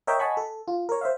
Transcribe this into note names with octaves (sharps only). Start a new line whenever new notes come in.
A#4 C#5 D#5 E5 G5 A#5
D#5 F#5 G#5 A5 B5 C#6
A4
F4
A#4 C#5
C5 E5 F5